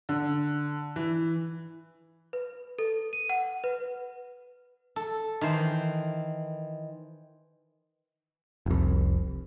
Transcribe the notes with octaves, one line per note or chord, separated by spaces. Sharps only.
D3
E3
B4
A4
D#7
F#5
B4
A4
D#3 E3 C5
F1 C2